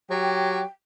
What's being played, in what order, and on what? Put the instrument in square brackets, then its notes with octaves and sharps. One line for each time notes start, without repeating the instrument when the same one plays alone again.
[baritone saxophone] F#3 [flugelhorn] G4 [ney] G5